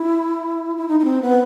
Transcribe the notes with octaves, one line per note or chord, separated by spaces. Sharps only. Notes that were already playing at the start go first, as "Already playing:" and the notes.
Already playing: E4
E4
D#4
D#4
C4
B3